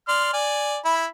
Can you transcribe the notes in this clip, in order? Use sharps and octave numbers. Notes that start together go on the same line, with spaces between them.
D5 C6 F6
D5 G#5
E4 B5